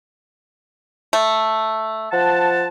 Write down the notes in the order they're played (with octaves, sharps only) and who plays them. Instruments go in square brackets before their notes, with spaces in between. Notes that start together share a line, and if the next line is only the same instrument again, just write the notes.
[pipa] A3
[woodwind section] F3 F#5 A5